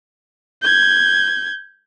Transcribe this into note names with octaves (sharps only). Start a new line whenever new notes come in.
G6 G#6